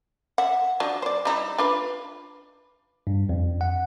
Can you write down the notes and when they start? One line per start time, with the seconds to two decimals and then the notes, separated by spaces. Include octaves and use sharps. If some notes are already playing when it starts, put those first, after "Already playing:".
0.38 E5 F#5
0.80 F3 F#3 D4
1.02 C5 D5
1.25 G3 D#4 E4
1.58 D4 F4 B4
3.07 G2
3.29 F2
3.61 F#5